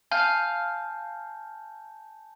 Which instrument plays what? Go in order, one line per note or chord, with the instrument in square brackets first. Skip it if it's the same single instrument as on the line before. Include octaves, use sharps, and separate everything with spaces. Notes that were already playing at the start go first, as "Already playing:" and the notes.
[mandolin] F5 [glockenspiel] G#5 A5 G6